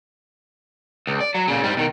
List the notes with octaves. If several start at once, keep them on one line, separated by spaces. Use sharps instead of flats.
C#2
D5
F#3
A#2 C#3
G#2 G3
B2 D#3